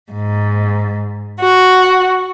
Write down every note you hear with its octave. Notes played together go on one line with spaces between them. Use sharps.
G#2
F#4